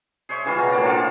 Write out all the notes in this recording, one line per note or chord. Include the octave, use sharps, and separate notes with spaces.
G#4 C5 C#5 E5
C#3 E3 G3 F4
B2 A#5
A2 F#3 A#3 D5
D3 F3 F4 A4